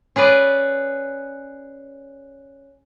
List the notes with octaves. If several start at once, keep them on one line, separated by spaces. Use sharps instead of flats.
C#4 G#4 B4 D5